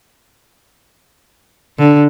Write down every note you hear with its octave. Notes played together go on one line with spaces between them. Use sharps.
D3